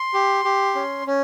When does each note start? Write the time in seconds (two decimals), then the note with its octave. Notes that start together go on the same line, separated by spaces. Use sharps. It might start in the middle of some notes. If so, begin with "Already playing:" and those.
Already playing: C6
0.14 G4
0.45 G4
0.75 C#4
1.06 C#4